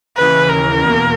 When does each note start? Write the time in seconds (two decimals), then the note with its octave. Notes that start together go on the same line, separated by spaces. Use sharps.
0.16 D#2 C#3 E3 B4
0.48 A#4
0.81 E2 B2 A#3